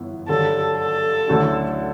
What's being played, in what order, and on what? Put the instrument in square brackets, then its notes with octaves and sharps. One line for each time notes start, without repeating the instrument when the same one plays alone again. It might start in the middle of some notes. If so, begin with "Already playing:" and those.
Already playing: [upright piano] G1 F#2 E3 B3
[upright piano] G2 D3 F#3 [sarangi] A4
[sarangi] A4
[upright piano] D2 D3 F#3 C#4 E4